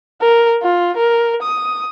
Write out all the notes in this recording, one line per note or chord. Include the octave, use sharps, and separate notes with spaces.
A#4
F4
A#4
D#6